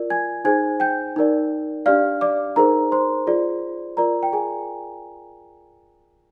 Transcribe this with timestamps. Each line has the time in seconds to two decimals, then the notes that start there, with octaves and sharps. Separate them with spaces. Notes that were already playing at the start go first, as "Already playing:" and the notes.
Already playing: F4 A#4 D5
0.10 G#5 G#6
0.44 D#4 G#4 C5 G#5 G#6
0.80 G5 G6
1.16 D#4 A#4 D5
1.86 D4 G4 D5 F5 F6
2.21 D5 D6
2.56 D#4 G#4 A#4 C5 A#5
2.92 C5 C6
3.27 F4 G#4 D5
3.97 F4 A#4 D5 A#5
4.23 G5
4.33 G#4 G#5